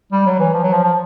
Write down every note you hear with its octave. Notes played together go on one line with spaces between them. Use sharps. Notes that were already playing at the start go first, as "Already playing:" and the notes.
G3
F#3
E3
F3
F#3
F3
F3